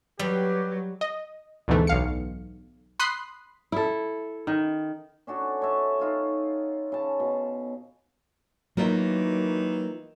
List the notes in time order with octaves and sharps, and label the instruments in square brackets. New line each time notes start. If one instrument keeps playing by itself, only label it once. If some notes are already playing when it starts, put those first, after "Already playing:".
[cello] F#3 [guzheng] G3 [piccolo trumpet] G4 [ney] B4
[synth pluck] D#5
D2 G#2 B2 E3 A3
B1 F5 C#7
B5 C6 D#6 F#6 C7
[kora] E4 A4
D#3
[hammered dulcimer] C#4 D4 F#4 A4
C#5 D#5 E5 A5
D#4 F4 C#5
C#3 A5
B2
[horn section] D#3 E3 [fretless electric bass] F#3 [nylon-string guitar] A#3 F4 E5